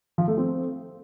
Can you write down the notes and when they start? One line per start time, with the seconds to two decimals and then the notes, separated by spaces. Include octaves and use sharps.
0.18 F3
0.28 A3
0.38 C4